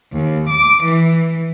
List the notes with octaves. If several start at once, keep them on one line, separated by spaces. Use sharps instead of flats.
D#2
D6
E3